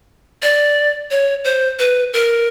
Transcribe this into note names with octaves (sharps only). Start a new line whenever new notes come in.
D5
C#5
C5
B4
A#4